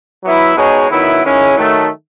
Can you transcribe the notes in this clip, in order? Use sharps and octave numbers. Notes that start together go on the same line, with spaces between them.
F#3 B3 E4
B2 G#3 D#4 G#4 C#5
D#3 F#3 B3 E4
D#3 G#3 C#4 E4 G#4
D#3 F#3 A3